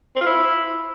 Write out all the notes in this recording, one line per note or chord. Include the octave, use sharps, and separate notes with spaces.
C4
F4
E4